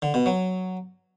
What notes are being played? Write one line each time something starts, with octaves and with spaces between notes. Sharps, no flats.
D3
B2
F#3